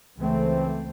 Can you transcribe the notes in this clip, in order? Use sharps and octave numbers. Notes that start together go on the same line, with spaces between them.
C#2 E3 A3 C4